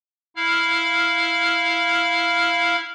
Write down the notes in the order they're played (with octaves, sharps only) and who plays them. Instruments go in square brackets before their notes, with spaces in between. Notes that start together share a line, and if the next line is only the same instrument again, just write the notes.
[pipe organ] E4 F5 F6